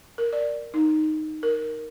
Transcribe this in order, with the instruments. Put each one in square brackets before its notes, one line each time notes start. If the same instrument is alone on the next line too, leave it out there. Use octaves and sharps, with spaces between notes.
[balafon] A#4
D5
D#4
A#4